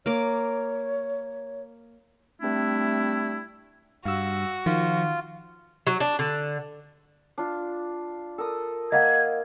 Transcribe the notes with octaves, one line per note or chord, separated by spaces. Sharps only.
A#3 C#5 D6
G3 A3 C4 D4 E4
G2 F#4 F5 E6
D#3 F3 F4
F#3
D4
D3
D4 F4
A4 A#4 D#6
A#3 D#5 F5 F#5 G#6